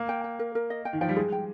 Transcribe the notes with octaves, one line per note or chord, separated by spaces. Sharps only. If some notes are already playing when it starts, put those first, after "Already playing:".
Already playing: A#3
G5
G5
A#4
A#4
D#5
G5
D#3
F3 G5
G3
G#3 G#4
G5